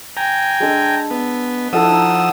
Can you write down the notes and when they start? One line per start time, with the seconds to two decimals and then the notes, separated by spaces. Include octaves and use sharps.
0.17 G5 G#5 A#5
0.60 G#3 D4 A4
1.11 B3
1.73 F3 E4 A4 F#5 D#6 E6
1.91 D#4